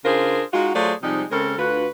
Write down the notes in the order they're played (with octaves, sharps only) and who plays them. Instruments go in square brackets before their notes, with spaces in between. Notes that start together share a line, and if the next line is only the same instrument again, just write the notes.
[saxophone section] C#3 D4 F4 G#4 A#4 C5
G#3 D#4 F4 F#4
F#3 A3 F4 G#4 C5 D5
C3 F3 G3 G#3 D#4
C#3 G#3 C4 A4 A#4
D2 D3 F4 F#4 B4